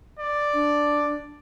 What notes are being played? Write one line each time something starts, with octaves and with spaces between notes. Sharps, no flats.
D5
D4